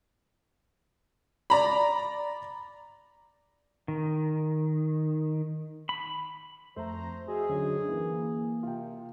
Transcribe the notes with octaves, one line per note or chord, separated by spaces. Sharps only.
D5 A#5 B5
D#3
B5
F2 A3 C5 A#5
F#4 G#4 D#5 E5
F#2 D3 F#4
E3 A#3
C3 F4 G5